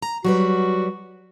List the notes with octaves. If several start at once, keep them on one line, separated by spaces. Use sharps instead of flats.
A#5
F#3 G3 F#4 B4